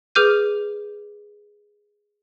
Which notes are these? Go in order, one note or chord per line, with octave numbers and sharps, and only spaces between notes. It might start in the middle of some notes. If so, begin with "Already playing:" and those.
G#4 B4 D6 F6 G6 D#7